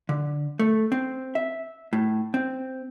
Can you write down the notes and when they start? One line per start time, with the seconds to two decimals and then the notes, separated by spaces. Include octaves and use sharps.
0.09 D3
0.59 A3
0.92 C4
1.35 E5
1.93 A2
2.34 C4